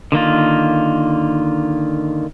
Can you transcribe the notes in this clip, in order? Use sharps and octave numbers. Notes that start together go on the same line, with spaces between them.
D3 D#3 A#3 F4